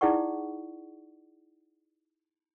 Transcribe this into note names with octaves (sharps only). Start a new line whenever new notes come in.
D#4 E4 G#4 D5 F#5 C#6